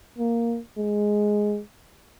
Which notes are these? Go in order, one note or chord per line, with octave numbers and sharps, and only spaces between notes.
A#3
G#3